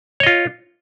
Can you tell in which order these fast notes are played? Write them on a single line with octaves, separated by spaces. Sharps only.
C#5 D#5 F4